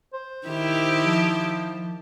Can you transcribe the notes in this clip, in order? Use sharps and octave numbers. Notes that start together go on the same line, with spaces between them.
C5
D#3 E4 G4
F3